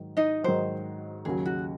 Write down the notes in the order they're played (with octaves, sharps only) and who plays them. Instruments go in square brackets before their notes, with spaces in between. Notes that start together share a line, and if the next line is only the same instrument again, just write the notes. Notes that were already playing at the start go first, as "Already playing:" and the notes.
Already playing: [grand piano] G#2 D#3 F#3
[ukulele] D#4 D#5
[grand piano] G#2 D#3 F#3 [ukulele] C5
[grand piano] D#2 C#3 F#3 [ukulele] G#4
[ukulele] F#4